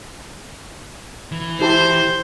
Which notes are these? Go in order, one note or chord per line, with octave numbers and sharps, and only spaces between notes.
E3
E4 G4 C5 A5